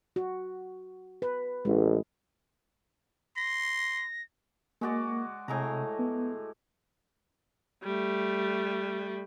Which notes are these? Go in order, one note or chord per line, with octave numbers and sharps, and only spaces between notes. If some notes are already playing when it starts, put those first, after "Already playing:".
F#4
B4
A1 G#3
C6 A#6
G#3 A#3 F#4 D5
A2 C3 G#3 A#5
B3
G3 A3